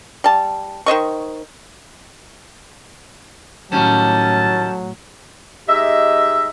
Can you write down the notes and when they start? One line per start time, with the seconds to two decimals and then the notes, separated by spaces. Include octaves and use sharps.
0.24 G3 A5
0.86 D#3 C5 D#5 C#6
3.72 A2 D#3 F#3 G3 C#4 A5
5.68 G#3 D#4 G4 D#5 E5